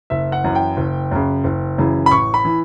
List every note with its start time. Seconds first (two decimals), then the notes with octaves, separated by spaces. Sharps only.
0.10 F#1 E5
0.32 F#5
0.44 F#2 E3
0.55 G5
0.77 F#1
1.11 F#2 C#3
1.44 F#1
1.78 F#2 C#3 E3
2.06 B5
2.11 A1 C#6
2.34 B5
2.45 E3